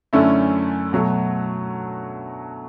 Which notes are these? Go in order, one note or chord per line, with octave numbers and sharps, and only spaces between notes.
F#2 D3 A3 C#4 E4
B2 F#3 A3